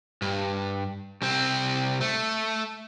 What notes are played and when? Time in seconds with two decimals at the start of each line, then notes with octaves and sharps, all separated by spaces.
0.22 G2
1.22 C2 C4
2.01 A3